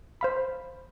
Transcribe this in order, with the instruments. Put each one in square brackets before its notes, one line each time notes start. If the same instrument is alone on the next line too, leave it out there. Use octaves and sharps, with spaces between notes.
[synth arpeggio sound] C5 F5 B5